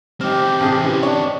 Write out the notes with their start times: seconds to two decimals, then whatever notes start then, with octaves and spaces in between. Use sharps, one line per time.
0.21 C4 D#4 G4 F6
0.60 A1 C3 G#4
0.80 C3 E3 C#4 G4
1.03 D4 C#5